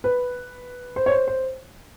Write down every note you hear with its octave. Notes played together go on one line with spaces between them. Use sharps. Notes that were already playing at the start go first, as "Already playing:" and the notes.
B4
C5
C#5
C5
C5